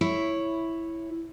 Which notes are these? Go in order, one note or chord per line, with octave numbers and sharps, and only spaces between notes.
E4 C#5